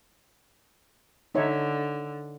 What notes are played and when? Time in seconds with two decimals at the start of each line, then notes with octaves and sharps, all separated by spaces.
1.35 D3 D#4 C#5 E5